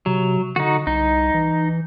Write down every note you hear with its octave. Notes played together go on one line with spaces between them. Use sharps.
C3 F#3
D3 D#4 F#4
C2 D#4
E3